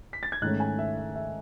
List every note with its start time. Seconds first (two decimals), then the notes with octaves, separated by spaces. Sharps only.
0.13 B6
0.23 A6
0.32 G#6
0.42 G#2 D#3 A3 C#4 F#6
0.60 G#5
0.79 E5
0.97 E5
1.15 E5